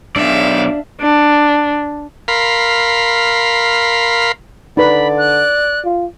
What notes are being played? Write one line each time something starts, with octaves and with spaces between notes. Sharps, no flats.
B1 D4 D5 E5 F5
D4
A#4 F5 B5 C6
D3 D#4 B4 D5 B5
F#6
F4